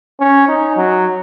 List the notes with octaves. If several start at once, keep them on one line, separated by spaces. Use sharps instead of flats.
C#4
D#4
F#3